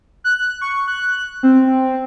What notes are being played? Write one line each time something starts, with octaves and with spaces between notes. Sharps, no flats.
F#6
C#6
F#6
C4